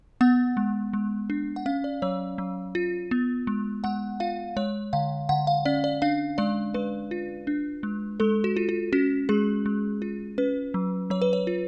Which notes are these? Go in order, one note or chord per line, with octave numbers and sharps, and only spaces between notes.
B3 F#5
G#3
G#3
D4
F#5
C#4 F5
D5
F#3 C#5
F#3
F4
B3
G#3
G#3 F#5
F4 F5
G#3 C#5
D3 F5
D3 F#5
F5
C#4 D5
D5
D4 F5
G#3 D5
G#3 B4
F4
D4
G#3
G#3 A4
F#4
F4
F4
C#4 F#4
G#3 G#4
G#3
F4
C#4 B4
F#3
F#3 C#5
B4
C#5
F4